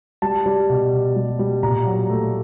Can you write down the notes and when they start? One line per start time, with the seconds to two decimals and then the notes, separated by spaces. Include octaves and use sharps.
0.22 G3 A5
0.46 G3
0.69 B2
0.93 B2
1.16 G3
1.39 G3
1.63 A#2 A#5
1.87 F#3
2.10 A3